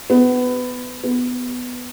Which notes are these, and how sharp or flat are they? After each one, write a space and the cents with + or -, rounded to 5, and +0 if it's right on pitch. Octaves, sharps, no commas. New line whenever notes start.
B3 +20
B3 +10